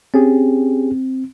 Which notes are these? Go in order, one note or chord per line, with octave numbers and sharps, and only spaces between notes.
C4 C#4 G4 G#4